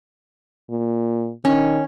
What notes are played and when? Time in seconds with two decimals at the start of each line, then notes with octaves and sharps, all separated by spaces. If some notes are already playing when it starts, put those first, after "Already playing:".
0.70 A#2
1.45 D#3 C#4